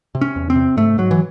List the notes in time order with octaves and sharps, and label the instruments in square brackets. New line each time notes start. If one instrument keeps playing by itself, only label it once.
[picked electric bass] C3
C#4
E2
C4
C3
G#2 A3
G#2 F#3
E3